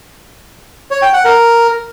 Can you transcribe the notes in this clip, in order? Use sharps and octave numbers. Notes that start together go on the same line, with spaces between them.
C#5
G5
F#5
A#4